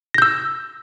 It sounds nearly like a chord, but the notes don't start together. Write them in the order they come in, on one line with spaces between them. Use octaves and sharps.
A#6 G6 E6